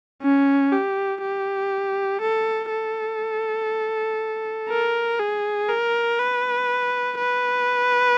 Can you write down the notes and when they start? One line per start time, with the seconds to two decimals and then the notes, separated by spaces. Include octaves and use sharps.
0.22 C#4
0.72 G4
1.22 G4
2.21 A4
2.71 A4
4.69 A#4
5.19 G#4
5.68 A#4
6.19 B4
7.18 B4